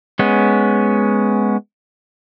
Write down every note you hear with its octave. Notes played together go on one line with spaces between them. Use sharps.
G#3 B3 C#4